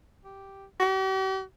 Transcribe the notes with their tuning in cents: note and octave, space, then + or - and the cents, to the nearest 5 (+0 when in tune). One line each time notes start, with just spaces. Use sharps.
G4 -5
G4 -45